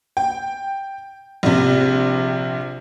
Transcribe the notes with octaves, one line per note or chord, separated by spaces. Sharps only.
G5
A#1 C3